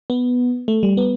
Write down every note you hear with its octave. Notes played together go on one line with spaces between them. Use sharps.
B3
A3
G3
B3